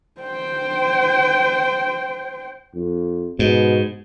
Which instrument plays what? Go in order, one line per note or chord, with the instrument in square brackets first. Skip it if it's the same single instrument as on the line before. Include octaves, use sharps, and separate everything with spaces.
[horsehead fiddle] C5 G5
[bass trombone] F2
[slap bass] G#2 [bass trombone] B2